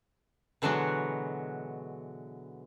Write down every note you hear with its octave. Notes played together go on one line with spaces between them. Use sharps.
B2 D3 E3 F#3 G#3 F#4